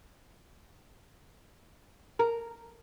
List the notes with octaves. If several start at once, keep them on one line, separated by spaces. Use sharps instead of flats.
A#4